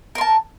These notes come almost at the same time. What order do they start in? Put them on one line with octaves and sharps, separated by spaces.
A#4 C6 A5